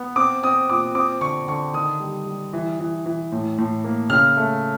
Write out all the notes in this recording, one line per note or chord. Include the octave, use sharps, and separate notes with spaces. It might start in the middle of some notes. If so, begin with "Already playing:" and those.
Already playing: B3
C4 D6
C4 D#6
A#2 D6
C4 D6
D3 C#6
D3 C#6
D#3 D#6
G3
G3
E3
E3
E3
A2
A2
A#3
C#3 F6
A3